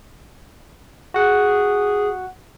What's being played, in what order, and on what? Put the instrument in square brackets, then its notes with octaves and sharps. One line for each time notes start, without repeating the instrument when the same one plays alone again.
[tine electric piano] F#4 F#5 [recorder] G#4